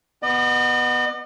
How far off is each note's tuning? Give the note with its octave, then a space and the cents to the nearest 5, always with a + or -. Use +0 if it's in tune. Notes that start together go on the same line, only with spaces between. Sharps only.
B3 +0 D#5 -45